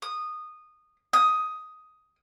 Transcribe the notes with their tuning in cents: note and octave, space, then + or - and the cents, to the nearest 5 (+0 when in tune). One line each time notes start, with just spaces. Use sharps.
D#6 -15
D#6 +10